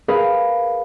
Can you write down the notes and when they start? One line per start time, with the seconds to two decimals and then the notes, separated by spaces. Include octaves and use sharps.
0.08 G#4 A#4 B4 F5